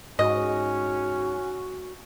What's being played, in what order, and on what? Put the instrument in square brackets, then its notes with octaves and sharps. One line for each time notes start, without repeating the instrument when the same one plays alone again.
[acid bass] G#2 [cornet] C#4 [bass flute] F#4 [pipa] D#5